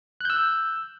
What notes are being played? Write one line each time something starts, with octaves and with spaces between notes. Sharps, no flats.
E6 F#6 G6